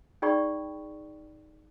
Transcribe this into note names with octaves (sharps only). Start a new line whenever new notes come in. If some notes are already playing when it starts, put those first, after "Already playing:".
D#4 G#4 D5 G5 B5 C#6